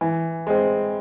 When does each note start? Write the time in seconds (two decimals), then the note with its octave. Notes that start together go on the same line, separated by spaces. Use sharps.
0.01 E3
0.47 G#3 C4